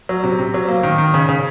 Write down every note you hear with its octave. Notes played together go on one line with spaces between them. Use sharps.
F#3
C3
C3
F#3
A#3
D#3
D#3
C#3
C#3